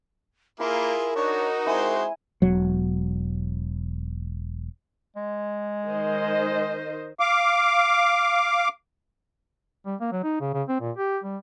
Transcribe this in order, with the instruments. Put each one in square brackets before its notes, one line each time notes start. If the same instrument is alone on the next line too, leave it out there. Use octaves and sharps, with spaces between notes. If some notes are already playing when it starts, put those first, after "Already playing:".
[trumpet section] A#3 [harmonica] E4 F4 G#4 [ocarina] A#4 [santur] B5
[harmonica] D4 C#5 [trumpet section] D#4 F#4
[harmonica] G#3 C4 C5 [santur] E4 G#5
[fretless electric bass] E1 F#3
[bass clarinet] G#3
[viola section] D#3 C5 D#5
[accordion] F5 D6
[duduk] G3
A#3
F#3
D#4
C#3
C#3
C4
A#2
G4
G3